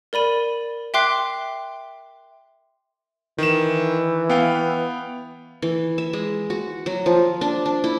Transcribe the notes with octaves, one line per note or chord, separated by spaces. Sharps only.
A#4 D5 B5 D#7
E5 G5 C6 D6 F#6 C7
D#3 E3 E7
B3 F5 G5
E3
E5
G#3
F#4
F#3
F3
D4
D4
E4